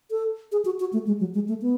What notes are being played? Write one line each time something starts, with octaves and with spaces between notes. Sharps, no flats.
A4
G#4
F#4
F#4
A3
G#3
F#3
G#3
A3
B3